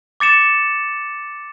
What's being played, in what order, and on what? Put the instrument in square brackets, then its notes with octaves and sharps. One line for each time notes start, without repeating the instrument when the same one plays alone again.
[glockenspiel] D6 A6 C#7 E7